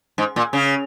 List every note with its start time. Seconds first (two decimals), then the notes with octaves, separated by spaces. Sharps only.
0.18 G#2
0.36 A#2
0.53 C#3